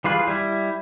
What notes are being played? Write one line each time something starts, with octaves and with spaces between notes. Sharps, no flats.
E3 G3 F4 G#4 B4
G3 E4